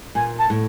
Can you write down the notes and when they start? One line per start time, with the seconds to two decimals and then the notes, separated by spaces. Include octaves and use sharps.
0.15 A#2 G#5
0.39 A5
0.50 A2